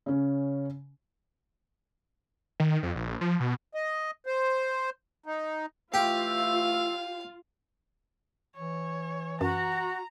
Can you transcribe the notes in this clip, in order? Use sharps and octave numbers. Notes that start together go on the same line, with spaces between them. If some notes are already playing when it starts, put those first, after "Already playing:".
C#3 C#4
D#3
F2
A#1
F3
B2
D#5
C5
D#4
E3 A3 F4 G4 F5 E6
E3 C#5
F#2 F#4 A#5